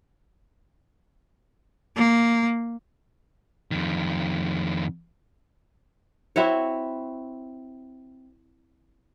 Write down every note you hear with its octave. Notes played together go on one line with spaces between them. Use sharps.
A#3
F2 D#3
C4 E4 F#4 C#5